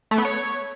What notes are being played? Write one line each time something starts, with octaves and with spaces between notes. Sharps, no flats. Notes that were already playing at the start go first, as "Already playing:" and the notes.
A3
B3
C#5